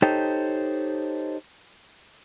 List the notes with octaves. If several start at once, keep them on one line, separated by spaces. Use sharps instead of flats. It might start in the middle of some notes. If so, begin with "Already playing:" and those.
D#4 G4 A4 C5 C#5 G5